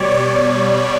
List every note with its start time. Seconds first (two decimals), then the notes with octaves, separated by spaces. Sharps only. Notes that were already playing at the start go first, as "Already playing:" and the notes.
Already playing: B2 G3 C#5 D5
0.11 D5